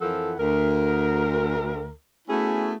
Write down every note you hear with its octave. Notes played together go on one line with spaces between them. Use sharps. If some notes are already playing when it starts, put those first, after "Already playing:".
F2 E3 F3 A4 A#4 F#5
D2 A#4
A3 B3 C#4 E4 F#4 G#4